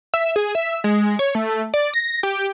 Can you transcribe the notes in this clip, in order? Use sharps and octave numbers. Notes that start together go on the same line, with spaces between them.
E5
G#4
E5
G#3
C#5
A3
D5
A#6
G4